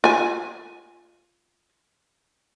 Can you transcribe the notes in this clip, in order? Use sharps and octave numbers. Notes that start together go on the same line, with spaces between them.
F4 G#5